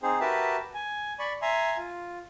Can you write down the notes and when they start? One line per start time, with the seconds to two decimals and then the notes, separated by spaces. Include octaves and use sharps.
0.03 C4 D#4 G#4 C5
0.20 F#4 G4 A#4 B4 E5 A5
0.74 G#5
1.19 D5 B5 C#6
1.42 E5 G#5 A#5 C6
1.77 F4